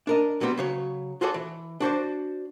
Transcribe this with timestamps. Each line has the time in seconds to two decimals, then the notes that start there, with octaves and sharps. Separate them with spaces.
0.07 D4 A#4 D#5
0.40 A#2 F#3 G3 B3 C4
0.58 C#3 F#3 C#5
1.21 F4 F#4 G#4 A4 C#5 D5
1.34 E3
1.80 D4 F#4 C5 D5